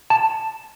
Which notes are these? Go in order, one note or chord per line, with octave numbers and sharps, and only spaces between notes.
A5